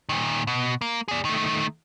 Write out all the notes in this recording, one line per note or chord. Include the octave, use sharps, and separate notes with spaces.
A#2 D#3
B2
A#3
G#4 D5
D#3 A3